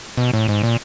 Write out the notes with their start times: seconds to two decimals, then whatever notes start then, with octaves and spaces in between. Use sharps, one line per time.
0.17 B2
0.34 A2
0.48 G#2
0.63 A#2